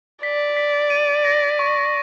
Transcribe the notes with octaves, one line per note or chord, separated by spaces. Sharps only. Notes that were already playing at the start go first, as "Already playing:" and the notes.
D5 B6
B6
D#7
A#6
C#6